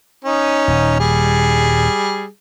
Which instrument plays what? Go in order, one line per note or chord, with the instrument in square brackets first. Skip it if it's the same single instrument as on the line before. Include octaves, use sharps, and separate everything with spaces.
[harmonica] C#4 D#4
[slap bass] D#1
[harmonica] G3 G#4